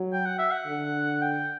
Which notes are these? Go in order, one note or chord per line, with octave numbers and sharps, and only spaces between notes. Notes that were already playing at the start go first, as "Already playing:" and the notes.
Already playing: F#3
G5
F#5
E5
F#5
D3
G5